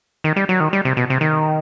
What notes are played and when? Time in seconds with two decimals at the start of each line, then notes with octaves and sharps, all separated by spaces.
0.24 D#3
0.36 G3
0.49 F#3
0.60 D#3
0.73 G3
0.85 C3
0.97 B2
1.10 C3
1.21 D#3